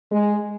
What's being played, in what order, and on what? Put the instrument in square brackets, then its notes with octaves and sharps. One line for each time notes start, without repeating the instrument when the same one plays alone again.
[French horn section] G#3